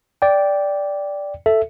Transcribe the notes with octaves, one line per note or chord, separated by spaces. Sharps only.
D5 G5
A4 E5